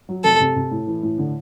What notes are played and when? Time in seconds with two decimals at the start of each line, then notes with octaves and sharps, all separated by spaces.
0.09 F#3
0.24 F1 A4
0.40 C3
0.56 C3
0.71 A2
0.87 E3
1.03 A2
1.18 D3